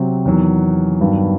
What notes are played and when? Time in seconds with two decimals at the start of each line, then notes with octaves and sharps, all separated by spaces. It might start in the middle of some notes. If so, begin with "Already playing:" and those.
Already playing: C3 F#3 C4 F#4
0.25 E2 D#3 F#3
1.00 G2 D#3 F#3 B3